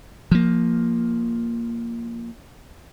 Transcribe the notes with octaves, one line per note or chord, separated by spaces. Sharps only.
F3 A#3